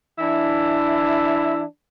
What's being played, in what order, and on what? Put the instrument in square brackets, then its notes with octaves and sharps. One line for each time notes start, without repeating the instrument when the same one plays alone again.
[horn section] E3 D4 E4